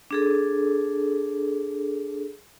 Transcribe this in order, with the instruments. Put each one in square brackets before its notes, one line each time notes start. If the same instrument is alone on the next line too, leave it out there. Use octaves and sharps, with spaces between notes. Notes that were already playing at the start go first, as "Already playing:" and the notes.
[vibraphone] D4 G#4 A4